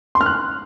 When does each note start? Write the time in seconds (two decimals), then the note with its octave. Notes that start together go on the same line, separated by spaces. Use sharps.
0.15 C6
0.21 F6
0.26 F#6